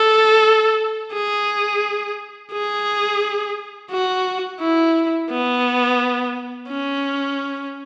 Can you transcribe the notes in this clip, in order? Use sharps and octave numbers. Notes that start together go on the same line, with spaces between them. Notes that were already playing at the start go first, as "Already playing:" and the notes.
Already playing: A4
G#4
G#4
F#4
E4
B3
C#4